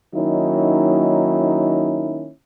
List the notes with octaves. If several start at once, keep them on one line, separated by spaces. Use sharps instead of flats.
D#3 F#3 A#3 C#4 D#4 E4